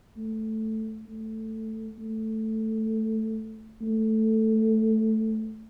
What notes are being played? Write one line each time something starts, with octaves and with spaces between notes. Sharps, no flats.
A3
A3
A3
A3